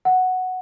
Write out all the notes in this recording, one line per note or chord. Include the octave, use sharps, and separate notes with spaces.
F#5